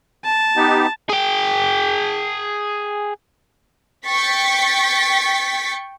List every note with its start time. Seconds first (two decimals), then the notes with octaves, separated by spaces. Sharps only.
0.24 A5
0.56 B3 D#4 G4
1.10 G#4 G5
4.05 G5 C#6 A6 B6